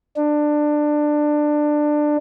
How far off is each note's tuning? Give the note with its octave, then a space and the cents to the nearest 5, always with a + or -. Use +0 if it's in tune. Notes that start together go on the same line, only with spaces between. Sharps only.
D4 +20